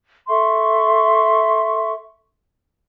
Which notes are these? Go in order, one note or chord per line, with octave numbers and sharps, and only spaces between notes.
A4 E5 C6 C#6